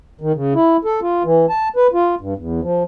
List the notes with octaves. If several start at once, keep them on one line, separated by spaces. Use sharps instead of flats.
D#3
C#3
E4
A4
F4
E3
A5
B4
F4
G2
E2
F3